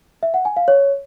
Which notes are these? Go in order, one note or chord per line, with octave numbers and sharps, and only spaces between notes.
E5
F#5
G#5
F5
C#5